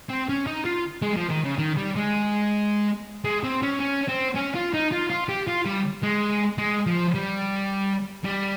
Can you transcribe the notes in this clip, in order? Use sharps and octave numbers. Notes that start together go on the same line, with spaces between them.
C4
C#4
D#4
F4
G#3
F3
D#3
C#3
D#3
G3
G#3
G#3
C4
C#4
C#4
C4
C#4
F4
D#4
F4
F4
G4
F4
G3
G#3
G#3
F3
G3
G3